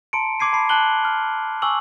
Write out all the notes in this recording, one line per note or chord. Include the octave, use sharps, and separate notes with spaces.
A5 A#5 C6 C#7 D7
C6 D6 G#6 C7 D#7
A5 B5 C7
A5 F6 F#6 F#7 G7
F6
G#5 C#6 D6 E6 F#7